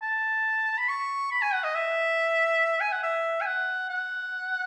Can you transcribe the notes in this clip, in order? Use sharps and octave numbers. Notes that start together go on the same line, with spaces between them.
A5
B5
C#6
B5
G#5
F#5
D#5
E5
G#5
F#5
E5
G#5
F#5
F#5